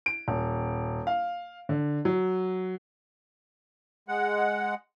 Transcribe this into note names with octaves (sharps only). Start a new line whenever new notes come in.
D7
D#1
F5
D3
F#3
G#3 F#5